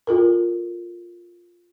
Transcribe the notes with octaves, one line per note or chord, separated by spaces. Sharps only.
F4 A4 A#4